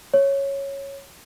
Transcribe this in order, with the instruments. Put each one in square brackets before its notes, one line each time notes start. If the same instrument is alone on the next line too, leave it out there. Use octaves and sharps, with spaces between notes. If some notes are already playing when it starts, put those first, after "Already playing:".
[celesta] C#5